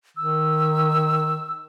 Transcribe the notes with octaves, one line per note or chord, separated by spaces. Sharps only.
D#3 E6